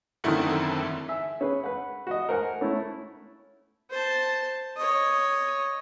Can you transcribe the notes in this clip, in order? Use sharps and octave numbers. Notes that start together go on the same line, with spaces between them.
F#2 D3 D#3 A3 C4 E4 A4 F#5
E5 G#5
C#4 G#4 B4
B4 F#5
F#4 D#5
A#4 C5 F#5 G#5
A3 C#4 E4
C5 A5
C#5 D#5